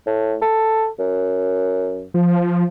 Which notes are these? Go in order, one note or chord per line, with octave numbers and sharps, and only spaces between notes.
A2
A4
F#2
F3